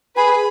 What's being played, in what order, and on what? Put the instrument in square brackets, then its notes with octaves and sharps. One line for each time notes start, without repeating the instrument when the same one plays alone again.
[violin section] G#4 B4 [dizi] B5